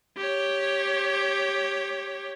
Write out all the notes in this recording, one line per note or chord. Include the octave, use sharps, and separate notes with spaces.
G4 C#5